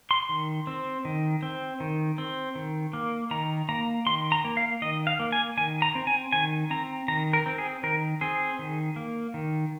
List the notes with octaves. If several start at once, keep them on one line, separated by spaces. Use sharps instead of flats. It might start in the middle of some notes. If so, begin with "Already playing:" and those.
C6
D#3
C4
D#3
C4
D#3
C4
D#3
A#3
D#3 A#5
A#3 A#5
D#3 C6
A#5
A#3
F5
D#3 D#5
F5
A#3
G#5
D#3 G#5
A#5
C4
G#5
D#3 G#5
C4 A#5
D#3 A#5
A#4
C4
G#4
D#3 A#4
C4 G#4
D#3
A#3
D#3